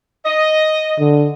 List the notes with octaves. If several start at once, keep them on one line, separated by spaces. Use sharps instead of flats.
D#5
D3